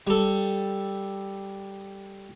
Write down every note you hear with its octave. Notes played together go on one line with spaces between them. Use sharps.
G3 A4